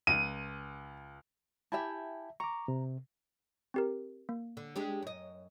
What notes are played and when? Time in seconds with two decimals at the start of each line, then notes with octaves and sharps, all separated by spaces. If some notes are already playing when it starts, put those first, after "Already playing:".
0.07 C#2 D#7
1.72 E4 G4 E5 G#5 A5
2.40 A#5 C#6 D6
2.68 C3
3.74 C4 G4 A#4
4.29 A#3
4.57 D3
4.76 G#3 D4 G4
5.02 F#2 D#5